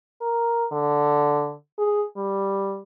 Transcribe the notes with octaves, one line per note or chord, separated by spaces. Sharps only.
A#4
D3
G#4
G3